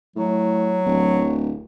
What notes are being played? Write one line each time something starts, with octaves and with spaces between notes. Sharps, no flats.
A2 F#3
D1